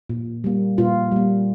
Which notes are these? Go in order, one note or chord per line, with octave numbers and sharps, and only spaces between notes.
A#2
G3 A#3
A#2 F4
G3 A#3